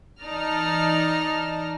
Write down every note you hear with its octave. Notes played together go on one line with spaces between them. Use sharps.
E3 D#4 D5 A5 A#5 F6